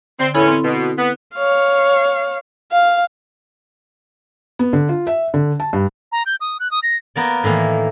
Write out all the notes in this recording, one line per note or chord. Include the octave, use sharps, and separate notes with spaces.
D3 C4
E2 A2 C#4 E4 A4 B5
C4
B2
B3
C#5 F5
F5
B3
D3
F4
E5
D3
A5
G2
A#5
G6
D#6
F#6
D#6
A#6
A#3 B3 A#4 D5
A2 D#3 E3 A#3